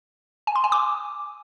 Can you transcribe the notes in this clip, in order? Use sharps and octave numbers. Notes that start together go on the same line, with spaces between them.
G#5
C6
G#5
D6